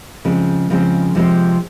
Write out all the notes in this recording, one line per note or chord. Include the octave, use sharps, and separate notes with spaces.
C#3 F3 G#3 C4
C#3 F3 G#3 C4
C3 F3 G#3 C4